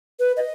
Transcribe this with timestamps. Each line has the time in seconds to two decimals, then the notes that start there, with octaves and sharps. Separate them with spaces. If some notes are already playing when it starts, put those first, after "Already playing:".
0.20 B4
0.37 D#5